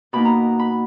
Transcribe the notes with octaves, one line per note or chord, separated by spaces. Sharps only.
B2 A#3 D#4 B5
A#5
B5